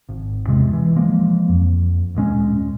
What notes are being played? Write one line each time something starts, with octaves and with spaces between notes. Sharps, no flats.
G#1
E2 C3 G#3
E3
F3 G#3 A#3
F2
D1 A#2 G#3 C#4